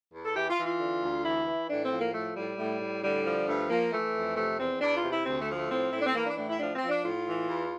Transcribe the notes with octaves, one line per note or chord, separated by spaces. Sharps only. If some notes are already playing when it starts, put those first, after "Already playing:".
E2
A4
E3 G4
F4
E3
F4
D3
D2
E3 E4
E3
A2 D4
C4
F3
A#3
A2 A3
A2 G3
A2
A2
D3 G3
F3
G2 A3
F3 A#3
E3 A3
F2
C3 A3
E2 C4
E2 D4
F4
C3
E4
D2 C4
A3
F3
A3
A2 C4
A2 E4
D4
C4
E3 A#3
D4
A2 D4
E4
F3 D4
C4
F3
D4
A2 F4
E3
E2